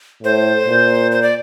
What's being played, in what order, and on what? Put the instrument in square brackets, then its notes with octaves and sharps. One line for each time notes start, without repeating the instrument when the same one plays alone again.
[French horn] A2 [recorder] C5
[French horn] A#2
[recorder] C5
D5